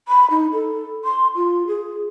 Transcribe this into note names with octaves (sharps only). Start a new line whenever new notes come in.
B5
D#4
A4
C6
F4
G#4